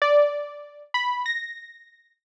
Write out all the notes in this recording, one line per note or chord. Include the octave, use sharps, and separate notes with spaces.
D5
B5
A#6